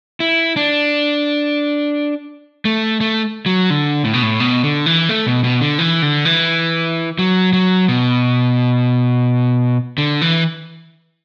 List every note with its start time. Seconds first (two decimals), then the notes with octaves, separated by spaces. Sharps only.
0.20 E4
0.56 D4
2.65 A3
3.01 A3
3.46 F#3
3.70 D3
4.05 A2
4.13 B2
4.22 A2
4.40 B2
4.63 D3
4.86 E3
5.09 A3
5.27 B2
5.44 B2
5.61 D3
5.79 E3
6.02 D3
6.25 E3
7.19 F#3
7.53 F#3
7.88 B2
9.98 D3
10.21 E3